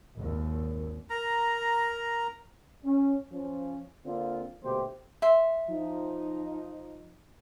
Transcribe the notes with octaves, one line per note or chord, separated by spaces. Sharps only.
G#1 D#2
A#4 A#5
C#4
F3 C#4
D3 A#3 C4 F4
A#1 B2 D3 A3 G4 C5
E5 C6
F3 D#4